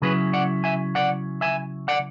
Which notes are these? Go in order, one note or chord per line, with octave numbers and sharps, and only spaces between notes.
C#3 F#3 C#4 E4 G#4 B4
D5 F#5
E5 G#5
D5 F#5
E5 G#5
D5 F#5